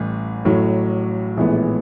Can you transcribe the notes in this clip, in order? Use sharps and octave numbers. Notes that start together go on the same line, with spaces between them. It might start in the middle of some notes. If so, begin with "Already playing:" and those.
Already playing: A1 A2 E3 G3
A1 A2 F#3
A#1 A2 E3 G#3 B3